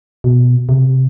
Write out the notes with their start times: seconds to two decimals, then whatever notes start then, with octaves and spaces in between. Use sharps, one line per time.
0.24 B2
0.69 C3